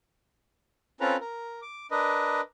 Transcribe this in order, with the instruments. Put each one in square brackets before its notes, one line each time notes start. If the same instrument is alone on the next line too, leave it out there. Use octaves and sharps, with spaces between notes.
[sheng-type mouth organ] C4 C#4 F4 A4 B4 A#5
A#4
D6
D4 A#4 B4 D#5